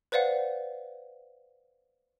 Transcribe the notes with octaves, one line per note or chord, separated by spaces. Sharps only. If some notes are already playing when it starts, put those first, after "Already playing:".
B4 C5 D5 F5 F#5